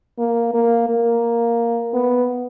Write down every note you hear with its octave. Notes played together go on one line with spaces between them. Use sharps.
A#3
A#3
A#3
B3